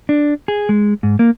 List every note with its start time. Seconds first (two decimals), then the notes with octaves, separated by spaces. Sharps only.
0.09 D4
0.48 G#4
0.69 G#3
1.03 G#2
1.19 A#3